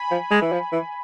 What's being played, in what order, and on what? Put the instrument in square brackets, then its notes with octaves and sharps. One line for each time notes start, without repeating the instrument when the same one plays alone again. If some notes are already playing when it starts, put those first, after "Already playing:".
Already playing: [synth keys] G#5 B5
[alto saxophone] F3
G#3
E3
F3
E3